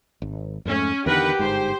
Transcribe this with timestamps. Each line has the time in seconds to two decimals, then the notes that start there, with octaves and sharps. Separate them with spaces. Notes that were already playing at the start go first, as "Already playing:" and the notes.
0.22 G#1
0.65 F2 G#2 A3 C#4
1.06 E2 D3 D#3 G4 A#4 B4 F#5
1.39 G1 G#2 C5